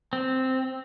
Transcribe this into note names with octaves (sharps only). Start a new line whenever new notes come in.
C4